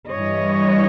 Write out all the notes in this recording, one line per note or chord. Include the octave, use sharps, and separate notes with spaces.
G2 E3 G3 C#5 D#5